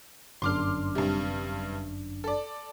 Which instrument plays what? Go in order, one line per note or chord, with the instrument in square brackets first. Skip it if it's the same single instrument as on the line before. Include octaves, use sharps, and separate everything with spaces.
[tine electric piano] G1 F#2 D4 [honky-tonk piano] C6 D6 F6
[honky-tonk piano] G2 C3
A4 D5